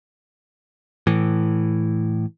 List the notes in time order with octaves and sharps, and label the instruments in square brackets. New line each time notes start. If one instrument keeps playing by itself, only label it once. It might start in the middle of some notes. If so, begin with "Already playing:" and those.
[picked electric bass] A2 E3